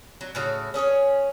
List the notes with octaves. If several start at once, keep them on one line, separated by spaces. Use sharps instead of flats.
F#3
A2 C#3 F#4
C#4 G#4 A4 C#5